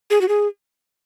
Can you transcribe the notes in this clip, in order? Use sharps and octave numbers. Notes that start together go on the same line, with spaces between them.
G#4
F#4
G#4